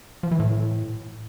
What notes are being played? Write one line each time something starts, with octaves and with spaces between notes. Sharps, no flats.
F3
E3
A2